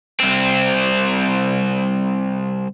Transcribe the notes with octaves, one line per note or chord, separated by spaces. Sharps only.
C2 C4